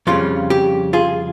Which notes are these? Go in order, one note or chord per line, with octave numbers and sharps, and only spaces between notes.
F2 C#3 G3 C#4 F4
G4
F4 G#4